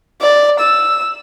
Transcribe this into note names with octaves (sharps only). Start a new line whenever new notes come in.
D5
E6